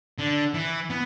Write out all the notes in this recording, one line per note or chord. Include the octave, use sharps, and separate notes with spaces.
D3
E3
B3